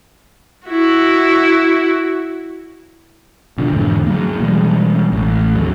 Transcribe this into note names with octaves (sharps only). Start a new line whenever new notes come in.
E4 F#4
B2 D3 F3
E2 G#2 D3
F#3 A#3
B2 E3 G3 G#3
A1
D#2 F#3